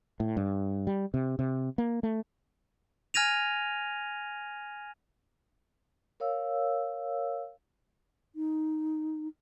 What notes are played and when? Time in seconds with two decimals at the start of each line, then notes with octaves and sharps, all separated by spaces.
0.20 A2
0.37 G2
0.87 G3
1.14 C3
1.39 C3
1.78 A#3
2.03 A3
3.14 G#5 F6 G#6 A#6 D#7 F7
6.20 A#4 C#5 F5 E6
8.36 D#4